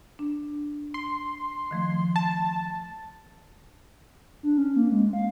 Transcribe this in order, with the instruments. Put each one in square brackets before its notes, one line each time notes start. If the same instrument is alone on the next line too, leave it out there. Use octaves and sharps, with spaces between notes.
[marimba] D4
[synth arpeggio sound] C6
[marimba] D#3 F3 A3
[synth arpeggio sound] A5
[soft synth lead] D4
C#4
A#3
G#3
F5